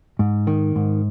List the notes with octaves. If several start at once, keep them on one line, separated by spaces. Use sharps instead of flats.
G#2
D#3
G#2